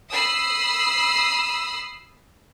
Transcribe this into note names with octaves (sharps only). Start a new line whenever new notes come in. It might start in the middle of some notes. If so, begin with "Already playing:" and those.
B5 D#6 E6 C7